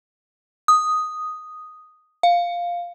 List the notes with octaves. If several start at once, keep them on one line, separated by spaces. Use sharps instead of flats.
D#6
F5